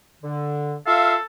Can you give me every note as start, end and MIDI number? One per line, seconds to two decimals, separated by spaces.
0.23 0.76 50
0.87 1.15 65
0.87 1.24 69
0.87 1.15 76
0.87 1.15 77